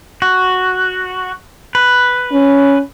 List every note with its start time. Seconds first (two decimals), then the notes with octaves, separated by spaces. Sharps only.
0.22 F#4
1.75 B4
2.32 C#4